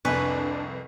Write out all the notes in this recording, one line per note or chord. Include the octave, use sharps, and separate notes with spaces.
C2 F2 D4 B4 G#5 C#6